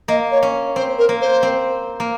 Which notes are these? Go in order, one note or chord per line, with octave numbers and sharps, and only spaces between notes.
A#3 D#5
C#5
C#4
C4 C5
A#4
A#3
C5
C4
A#3